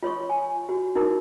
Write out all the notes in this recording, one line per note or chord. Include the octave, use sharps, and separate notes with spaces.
F4 C#5 C6 C#6
G#5
F#4
D#4 E4 F#4 A#4